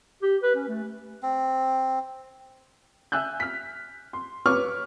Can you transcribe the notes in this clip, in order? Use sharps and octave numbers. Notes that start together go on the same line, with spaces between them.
G4
B4
C#4
A3
C4
E5 G#5 E6 F#6 G6
F6 B6
C6
B4 C#5 C#6 D6 F6